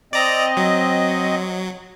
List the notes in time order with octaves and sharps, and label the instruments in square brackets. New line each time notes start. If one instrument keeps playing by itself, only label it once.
[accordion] C4 D#5 [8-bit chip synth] D5 A#5
[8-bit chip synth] F#3